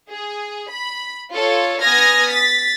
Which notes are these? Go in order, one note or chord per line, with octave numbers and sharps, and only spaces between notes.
G#4
B5
F4 A4 C#5
B3 G#5 D#6 F6 G#6 A#6
A6 B6